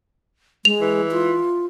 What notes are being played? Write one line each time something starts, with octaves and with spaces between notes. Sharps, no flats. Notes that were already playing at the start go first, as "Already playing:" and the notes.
G#3 F7
E3
F4